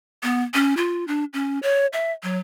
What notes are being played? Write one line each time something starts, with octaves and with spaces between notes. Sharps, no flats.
B3
C#4
F4
D4
C#4
C#5
E5
F#3